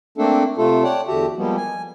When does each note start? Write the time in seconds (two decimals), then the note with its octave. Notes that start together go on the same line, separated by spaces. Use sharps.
0.18 A3 A#3 C4 D4 A4
0.58 C3 A3 F4 A4
0.84 C#5 D5 F#5 G5 A5
1.08 E2 D3 F#4 G4 E5 A5
1.37 F3 G3 G#3 A#3 B3
1.56 G#5